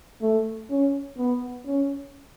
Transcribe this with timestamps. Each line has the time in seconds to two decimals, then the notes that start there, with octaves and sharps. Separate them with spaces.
0.21 A3
0.69 C#4
1.17 B3
1.65 C#4